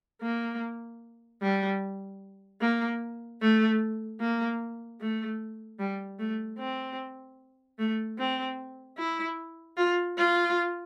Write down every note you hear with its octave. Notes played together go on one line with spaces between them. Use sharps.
A#3
G3
A#3
A3
A#3
A3
G3
A3
C4
A3
C4
E4
F4
F4